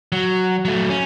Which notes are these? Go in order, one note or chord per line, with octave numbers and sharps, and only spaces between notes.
F#3
F#3 A3
C#4